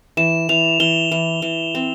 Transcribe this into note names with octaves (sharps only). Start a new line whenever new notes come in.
E3 E7
E3 F7
E3 G7
E3
E3
C4